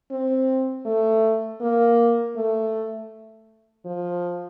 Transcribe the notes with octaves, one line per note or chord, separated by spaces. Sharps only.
C4
A3
A#3
A3
F3